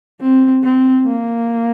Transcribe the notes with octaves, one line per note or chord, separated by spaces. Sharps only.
C4
C4
A#3